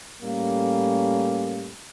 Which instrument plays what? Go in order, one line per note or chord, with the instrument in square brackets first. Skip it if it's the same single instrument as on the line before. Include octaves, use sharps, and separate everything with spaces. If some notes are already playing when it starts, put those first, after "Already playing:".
[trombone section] A2 G3 A#3 C#4